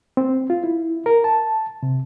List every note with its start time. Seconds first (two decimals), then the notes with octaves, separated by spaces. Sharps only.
0.17 C4
0.50 F4
0.64 E4
1.06 A#4
1.24 A5
1.83 C3